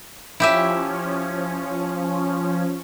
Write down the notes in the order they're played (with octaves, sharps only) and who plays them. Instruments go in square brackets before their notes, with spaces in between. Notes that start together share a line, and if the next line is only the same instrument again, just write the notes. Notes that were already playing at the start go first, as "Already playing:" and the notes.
[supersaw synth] F3 C#4 [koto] E4 G4 E5